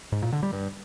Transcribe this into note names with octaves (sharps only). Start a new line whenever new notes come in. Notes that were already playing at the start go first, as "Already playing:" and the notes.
G#2
A#2
D3
G3
G2